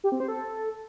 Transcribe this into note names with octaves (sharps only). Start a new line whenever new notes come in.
G4
C4
C5
A4